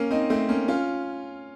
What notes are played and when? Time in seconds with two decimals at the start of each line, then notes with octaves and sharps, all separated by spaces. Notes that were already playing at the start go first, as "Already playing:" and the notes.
Already playing: A#3 C#4
0.11 C4 D#4
0.30 A3 C4
0.49 A#3 C#4
0.68 C#4 F4